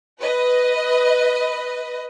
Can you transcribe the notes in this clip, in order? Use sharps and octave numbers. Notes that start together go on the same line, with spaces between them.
B4 D#5